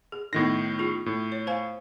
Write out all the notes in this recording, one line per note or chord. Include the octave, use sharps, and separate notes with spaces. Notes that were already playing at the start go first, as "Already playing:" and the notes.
G#4
A2 D#3 B3 D#4 A#6
F4 G#4
A2
C#5
C5 F5 G#5